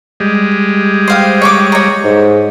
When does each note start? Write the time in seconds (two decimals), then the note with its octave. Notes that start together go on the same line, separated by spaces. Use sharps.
0.20 G3 G#3
1.08 C5 F5 G5
1.42 C#5 C#6 D6
1.72 C#5 A#5
2.04 G#2